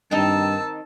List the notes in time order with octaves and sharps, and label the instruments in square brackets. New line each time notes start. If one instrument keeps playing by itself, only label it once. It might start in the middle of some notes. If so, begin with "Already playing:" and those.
[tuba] G2 [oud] D#3 C4 D#4 [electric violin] A5 E6